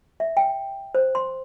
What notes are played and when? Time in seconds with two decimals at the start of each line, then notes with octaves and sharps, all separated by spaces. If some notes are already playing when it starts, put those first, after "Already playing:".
0.20 E5
0.37 G5
0.95 C5
1.15 C6